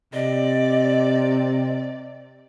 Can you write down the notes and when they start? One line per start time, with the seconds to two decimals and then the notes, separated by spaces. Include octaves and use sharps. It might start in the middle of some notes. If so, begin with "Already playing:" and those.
0.14 C3 D5 D#5